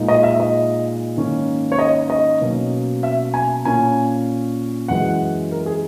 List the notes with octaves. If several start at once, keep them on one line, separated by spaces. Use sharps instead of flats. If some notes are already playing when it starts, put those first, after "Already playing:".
Already playing: A#2 G#3 D#4
D#5
E5
D#5
G#2 D#3 A#3 C#4
C#5
D#5
D#5
B2 F#3 A#3 C#4
E5
G#5
A#2 A#3 C#4 G#5
F#2 E3 G#3 F#5
A#4
G#4